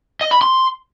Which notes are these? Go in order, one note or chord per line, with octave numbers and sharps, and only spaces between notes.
D#5
B5
C6